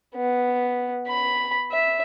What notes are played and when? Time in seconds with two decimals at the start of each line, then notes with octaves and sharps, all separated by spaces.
0.15 B3
1.08 B5
1.71 E5